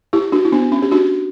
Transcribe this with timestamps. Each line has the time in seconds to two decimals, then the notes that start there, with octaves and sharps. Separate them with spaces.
0.13 E4 G4
0.32 D4 F#4
0.45 E4
0.52 B3 D4
0.72 C#4
0.82 G4
0.91 D4 F#4